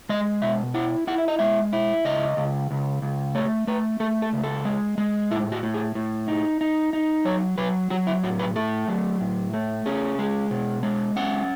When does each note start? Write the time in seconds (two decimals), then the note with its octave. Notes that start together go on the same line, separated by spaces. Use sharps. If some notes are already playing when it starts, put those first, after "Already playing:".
0.09 G#3 D#5
0.42 B2 E5
0.74 E4 F#5
1.07 E4 F#5
1.18 E5
1.28 D#5
1.39 G#3 E5
1.73 E4
2.05 C#2 D#5
2.37 C#2
2.71 C#2
3.02 C#2
3.35 A3 C#5
3.67 A3 B4
4.00 A3 A4
4.22 A4
4.33 C#2
4.44 A4
4.65 G#3
4.98 G#3
5.31 A2 E4
5.52 F#4
5.63 A2
5.74 G#4
5.95 A2
6.28 D#4
6.61 D#4
6.93 D#4
7.25 F#3 C#5
7.58 F#3 B4
7.90 F#3 F#4
8.07 E4
8.23 A2 F#4
8.39 B4
8.56 A3 A4
8.88 F#3
9.21 A2
9.53 A3
9.86 C#4 G#4
10.19 G#3
10.51 B2
10.83 G#3
11.16 C#4 F#5